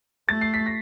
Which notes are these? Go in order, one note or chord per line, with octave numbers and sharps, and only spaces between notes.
A3 A6
C7
B6
A#6